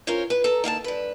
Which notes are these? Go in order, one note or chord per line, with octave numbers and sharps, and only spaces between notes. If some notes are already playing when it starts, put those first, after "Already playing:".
C#4 F4 A#4 C5 C#5
B4
A4 A#5
D#3 A#3 F5 A5
G2 B4